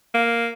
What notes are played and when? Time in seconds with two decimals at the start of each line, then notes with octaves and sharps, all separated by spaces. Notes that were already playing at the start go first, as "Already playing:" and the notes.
0.14 A#3